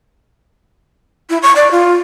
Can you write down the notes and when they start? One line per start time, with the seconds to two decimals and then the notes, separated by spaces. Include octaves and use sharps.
1.30 E4
1.42 C#6
1.56 D5
1.71 F4